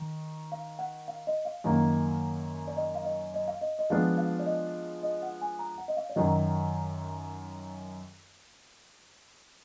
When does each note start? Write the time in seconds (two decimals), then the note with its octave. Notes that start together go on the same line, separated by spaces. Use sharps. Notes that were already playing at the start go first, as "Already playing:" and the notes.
Already playing: D#3
0.52 F5
0.79 F#5
1.08 F5
1.27 D#5
1.45 F5
1.64 F#2 D#3 A#3
2.67 D5
2.77 D#5
2.95 F5
3.05 D#5
3.34 D#5
3.48 F5
3.61 D#5
3.79 D#5
3.90 F3 G#3 B3 D4 F4 F5
4.18 F5
4.39 D5
4.46 D#5
5.03 D#5
5.23 F#5
5.41 G#5
5.59 A#5
5.78 F#5
5.88 D#5
5.97 F5
6.09 D5
6.16 F#2 D#3 F#3 D#5